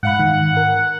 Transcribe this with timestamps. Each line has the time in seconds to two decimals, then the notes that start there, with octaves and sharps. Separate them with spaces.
0.03 G#2 F5 F#5 B5
0.19 G#2 D#3
0.57 A#4